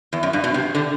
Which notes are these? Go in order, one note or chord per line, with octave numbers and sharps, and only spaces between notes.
E2
F#2
G2
B2
C3
D3